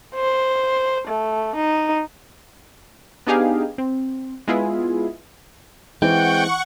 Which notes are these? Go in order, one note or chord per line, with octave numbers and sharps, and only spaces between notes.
C5
A3
D#4
B3 D4 D#4 G4 G#4 F5
C4
G#3 B3 E4 F4 G#4
E3 G#3 C4 F#5 G5 C#6